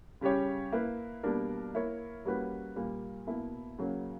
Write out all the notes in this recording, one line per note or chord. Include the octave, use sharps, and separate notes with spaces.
C#3 G3 C#4 G4 C#5
A#3 E4 B4
B2 G3 A#3 D4 A#4
A#3 E4 A#4 C#5
G3 A#3 C#4 F#4 B4
A#2 G3 A#3
B2 A#3 E4
C#3 F#3 A#3